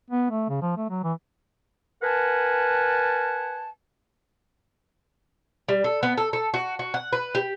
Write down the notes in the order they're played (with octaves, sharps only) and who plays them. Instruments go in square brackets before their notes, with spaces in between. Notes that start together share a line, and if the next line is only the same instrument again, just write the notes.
[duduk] B3
A3
C#3
F3
A3
F#3
E3
[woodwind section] A#4 B4 F#5 G#5 A5
[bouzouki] G3
A4
B3
A4
A4
F#4
F#4
F#5
B4
G4